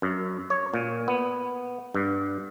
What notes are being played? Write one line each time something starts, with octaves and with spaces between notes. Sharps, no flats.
F#2
C#5
A#2
B3
G2